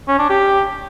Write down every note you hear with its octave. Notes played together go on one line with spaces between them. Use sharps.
C#4
D4
G4